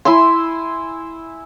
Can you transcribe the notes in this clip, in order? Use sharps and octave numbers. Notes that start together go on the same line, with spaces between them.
E4 E5 G#5 C6